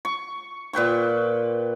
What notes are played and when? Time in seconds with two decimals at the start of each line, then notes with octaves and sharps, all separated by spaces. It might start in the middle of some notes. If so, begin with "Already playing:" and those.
0.05 C#6
0.73 A#2 B4 G5 C#6